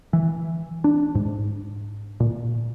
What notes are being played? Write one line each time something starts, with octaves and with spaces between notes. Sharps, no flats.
E3
D4
G#2
A#2